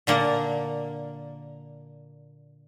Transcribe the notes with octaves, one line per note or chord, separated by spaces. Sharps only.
A#2 D3 A#3